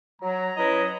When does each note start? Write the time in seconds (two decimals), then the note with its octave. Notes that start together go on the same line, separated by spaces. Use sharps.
0.22 F#3 A#5
0.57 C#4 E4 B4 D#5